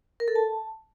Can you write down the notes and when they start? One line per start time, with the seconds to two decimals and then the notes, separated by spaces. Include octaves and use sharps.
0.20 A#4
0.28 A4
0.35 A5